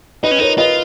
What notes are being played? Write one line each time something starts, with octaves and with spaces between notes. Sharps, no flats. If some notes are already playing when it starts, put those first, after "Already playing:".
D#4 B4 D#5
C#4
D#4 A#4 C#5
F4 B4 D#5